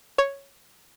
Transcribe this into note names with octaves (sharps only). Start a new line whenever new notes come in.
C#5